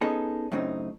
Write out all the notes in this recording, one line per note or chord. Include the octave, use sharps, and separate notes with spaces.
B3 C#4 D#4 G#4 A4
F#2 A2 C#3 C4 D#4